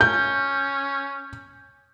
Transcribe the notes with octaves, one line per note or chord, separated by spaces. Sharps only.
C#4 G6